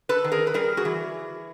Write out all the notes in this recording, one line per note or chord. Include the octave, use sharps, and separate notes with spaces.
A4 B4
D#3
G#4 A#4
B4
G3 G#4 A#4
F#4 G#4
E3